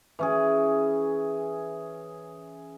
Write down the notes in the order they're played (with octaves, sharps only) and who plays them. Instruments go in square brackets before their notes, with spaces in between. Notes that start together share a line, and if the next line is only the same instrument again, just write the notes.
[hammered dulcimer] E3 C#4 G#4